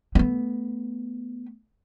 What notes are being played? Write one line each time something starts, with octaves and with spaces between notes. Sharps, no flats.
A3 B3